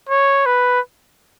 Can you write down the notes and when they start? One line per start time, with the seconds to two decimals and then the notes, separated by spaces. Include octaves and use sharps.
0.09 C#5
0.46 B4